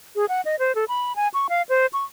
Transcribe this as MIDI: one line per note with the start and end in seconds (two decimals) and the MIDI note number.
0.16 0.25 68
0.29 0.41 78
0.45 0.56 75
0.59 0.75 72
0.75 0.85 69
0.88 1.16 83
1.16 1.28 80
1.34 1.47 85
1.49 1.62 77
1.69 1.86 72
1.93 2.05 85